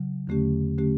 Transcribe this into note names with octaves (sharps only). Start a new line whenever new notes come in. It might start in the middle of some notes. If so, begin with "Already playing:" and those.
Already playing: C#3 F#3
E2 D3 A3 C#4 G4
D3 A3 C#4 G4